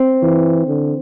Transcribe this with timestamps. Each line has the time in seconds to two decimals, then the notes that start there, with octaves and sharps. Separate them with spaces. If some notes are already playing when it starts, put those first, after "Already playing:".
Already playing: C4
0.22 E3
0.67 D3